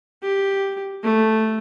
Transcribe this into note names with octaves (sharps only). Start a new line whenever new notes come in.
G4
A3